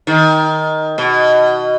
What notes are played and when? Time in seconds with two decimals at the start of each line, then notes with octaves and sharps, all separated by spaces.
0.07 D#3
0.98 B2